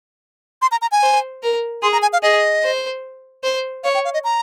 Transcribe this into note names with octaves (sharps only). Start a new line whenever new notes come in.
C6
A#5
A#5
G#5
C5
A#4
G#4 C6
A#5
G#5
F5
G#4 D#5
C5
C5
C#5 F5
G5
F5
D#5
A#5